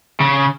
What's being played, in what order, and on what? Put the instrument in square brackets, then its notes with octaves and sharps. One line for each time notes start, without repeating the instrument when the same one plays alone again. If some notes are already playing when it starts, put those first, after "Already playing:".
[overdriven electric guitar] C#3